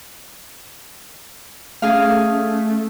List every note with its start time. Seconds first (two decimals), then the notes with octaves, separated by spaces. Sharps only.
1.82 A3 C#4 G#4 F5